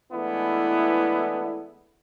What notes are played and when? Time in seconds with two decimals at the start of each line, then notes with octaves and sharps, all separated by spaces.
0.12 E3 G#3 A3 B3 D4 E4